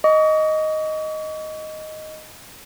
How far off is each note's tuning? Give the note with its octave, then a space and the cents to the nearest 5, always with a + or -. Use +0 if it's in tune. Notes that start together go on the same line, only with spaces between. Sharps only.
D#5 +0 C#6 +40